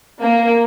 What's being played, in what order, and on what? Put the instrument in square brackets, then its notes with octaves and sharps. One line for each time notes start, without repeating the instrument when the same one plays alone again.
[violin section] A#3